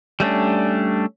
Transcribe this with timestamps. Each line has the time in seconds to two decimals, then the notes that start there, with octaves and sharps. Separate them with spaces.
0.20 G3 A3 C#4 D4